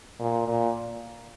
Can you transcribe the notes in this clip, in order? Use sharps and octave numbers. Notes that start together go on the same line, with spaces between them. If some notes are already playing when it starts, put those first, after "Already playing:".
A#2
A#2